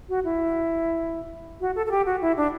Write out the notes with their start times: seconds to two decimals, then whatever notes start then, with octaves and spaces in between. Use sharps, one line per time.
0.09 F#4
0.25 E4
1.61 F#4
1.76 A4
1.86 A4
1.91 G4
2.06 F#4
2.22 E4
2.37 D4